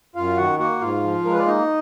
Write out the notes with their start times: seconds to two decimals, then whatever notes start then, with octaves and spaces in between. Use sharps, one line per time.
0.16 F#2 F4 F5
0.37 D#3 F#4 F#5
0.59 A#3 F#4 F#5
0.81 G#2 F4 F5
1.03 F3
1.25 G#3 A#4
1.32 B4
1.39 D5
1.45 A#3 D#4 D#5